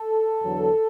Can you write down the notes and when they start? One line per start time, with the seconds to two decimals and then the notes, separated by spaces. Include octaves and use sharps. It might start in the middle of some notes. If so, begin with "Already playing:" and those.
Already playing: A4
0.43 E2 D3 F#3